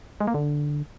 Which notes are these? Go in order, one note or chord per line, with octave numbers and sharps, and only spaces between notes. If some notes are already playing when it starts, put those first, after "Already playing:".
G#3
A#3
D3